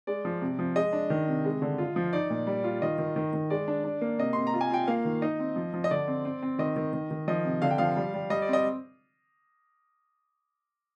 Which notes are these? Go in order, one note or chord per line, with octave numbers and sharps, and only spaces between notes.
G#3 D5
F3
C3
F3
G#3 D#5
D4
D#3
C3
G#3
D3
F4
F3
D#4 D5
A#2
G3
F4
D#3 D#5
D#3
D#3
D#3
G#3 D5
D4
D4
A#3
C3 D#5
C3 C6
A#5
F4
G#5
F4 G5
A#3 F5
D#3
D#4 D#5
C4
F3
F3
D#5
D3 D5
C4
C4
C4
D#3 D#5
D#3
D#3
D#3
F3 D#5
C3
D3 F5
G5
F3 F5
G3
G3
G3 D#5
D5
C4 D#5